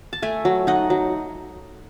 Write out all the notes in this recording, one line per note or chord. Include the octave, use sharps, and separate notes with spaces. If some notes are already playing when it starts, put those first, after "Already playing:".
A5
A3 E5 G#5
F#3
D#4 D#5 F#5
F#3